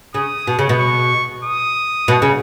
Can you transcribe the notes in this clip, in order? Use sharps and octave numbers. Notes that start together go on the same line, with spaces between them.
C#3 D#6
B2
C#3
B2
C#6
D#6
B2
C#3